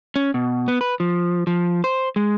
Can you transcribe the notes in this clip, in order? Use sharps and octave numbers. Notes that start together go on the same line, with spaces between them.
C#4
B2
B3
B4
F3
F3
C5
G#3